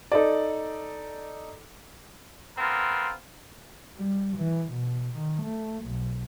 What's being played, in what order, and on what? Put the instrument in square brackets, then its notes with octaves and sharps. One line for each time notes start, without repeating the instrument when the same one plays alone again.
[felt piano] D#4 A4 D5
[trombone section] B3 C4 F4 A#4
[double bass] G3
E3
B2
D#3
A3
B1